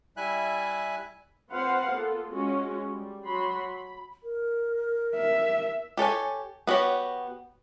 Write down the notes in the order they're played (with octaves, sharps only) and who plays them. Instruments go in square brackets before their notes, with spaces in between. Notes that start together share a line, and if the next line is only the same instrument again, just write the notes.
[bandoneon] G3 E4 E5 G#5 F#6
[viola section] C4 F4 B4 C5 F5 F#5
A#3 B3 F4 A4
G#3 C#4 F4 F#4
G3
F#3 B5 C6
B5
[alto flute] A#4
[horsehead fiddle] E5
[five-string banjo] G4 A4 C#5 G#5
B3 F#4 G4 C#5